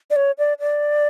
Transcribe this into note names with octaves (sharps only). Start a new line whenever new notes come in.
D5
C#5
D5
D5